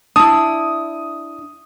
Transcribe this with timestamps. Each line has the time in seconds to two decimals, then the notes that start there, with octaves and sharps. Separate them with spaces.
0.16 D4 E4 D#6